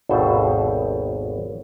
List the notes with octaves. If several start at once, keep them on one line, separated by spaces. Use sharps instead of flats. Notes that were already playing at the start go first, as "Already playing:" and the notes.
G#1 D#2 B2 A4 C5